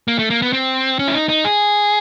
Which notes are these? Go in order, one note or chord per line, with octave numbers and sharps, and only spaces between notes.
A#3
A3
A#3
B3
C4
C#4
E4
D#4
D#4
G#4